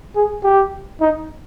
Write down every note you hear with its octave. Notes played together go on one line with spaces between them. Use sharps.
G#4
G4
D#4